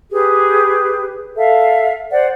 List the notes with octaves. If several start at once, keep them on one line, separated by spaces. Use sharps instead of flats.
G4 G#4 B4
A4 E5 F5
C5 D5 F#5